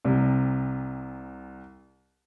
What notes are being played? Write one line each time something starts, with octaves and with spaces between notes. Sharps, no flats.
C2 C3